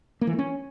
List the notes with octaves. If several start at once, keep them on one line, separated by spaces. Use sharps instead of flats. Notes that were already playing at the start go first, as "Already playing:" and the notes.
A#3
E3
A3
C#4